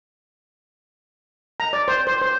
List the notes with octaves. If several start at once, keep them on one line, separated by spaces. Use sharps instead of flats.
A#5
D5
C5
C5
C5